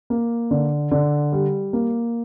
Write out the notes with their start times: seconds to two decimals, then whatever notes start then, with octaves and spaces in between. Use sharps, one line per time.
0.10 A#3
0.51 D3
0.91 D3
1.33 G3
1.73 A#3